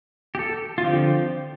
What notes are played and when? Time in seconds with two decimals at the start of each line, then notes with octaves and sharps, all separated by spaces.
0.35 G4
0.39 A4
0.78 F4
0.84 D3 F3 C4 G4